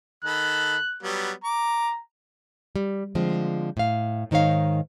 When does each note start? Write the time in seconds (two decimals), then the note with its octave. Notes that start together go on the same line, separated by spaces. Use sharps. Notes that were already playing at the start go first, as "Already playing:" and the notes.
0.25 D#3 A4 B5 F#6
1.03 F#3 G3 B3
1.44 A#5 D6
2.76 G3
3.15 D3 F3 G#3 C4
3.77 A2 F5
4.31 G#2 D#3 D#4 C#5 F5